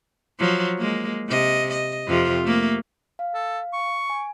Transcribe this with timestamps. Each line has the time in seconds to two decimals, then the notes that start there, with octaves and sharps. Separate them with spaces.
0.39 F3 F#3
0.78 G#3 A#3
1.28 C3 D#5
1.71 D#5
2.07 F2 C3 F4
2.44 A3 A#3
3.19 F5
3.35 A4
3.73 C#6
4.10 G#5